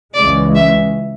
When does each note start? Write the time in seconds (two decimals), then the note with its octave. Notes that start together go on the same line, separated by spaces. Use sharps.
0.14 C#2 C#3 E3 G#3 D5
0.55 E5